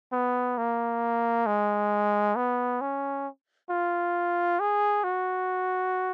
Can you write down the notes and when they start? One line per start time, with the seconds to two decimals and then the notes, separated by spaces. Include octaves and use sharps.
0.12 B3
0.58 A#3
1.47 G#3
2.36 B3
2.81 C#4
3.70 F4
4.60 G#4
5.04 F#4